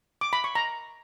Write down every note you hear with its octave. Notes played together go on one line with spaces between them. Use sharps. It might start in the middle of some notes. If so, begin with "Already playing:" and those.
D6
B5
C#6
A#5